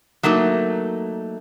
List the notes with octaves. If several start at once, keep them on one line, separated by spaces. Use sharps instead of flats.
F#3 A3 A#3 D#4